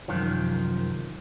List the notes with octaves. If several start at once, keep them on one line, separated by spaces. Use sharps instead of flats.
C2 F#2 D#3 F3